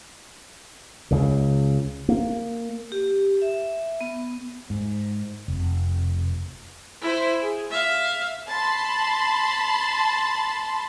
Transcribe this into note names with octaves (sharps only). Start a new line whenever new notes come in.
C#2 C#3
A#3
G4
E5
B3
G#2
F1
E4 C5
G#4
E5 F5
A5 B5 C6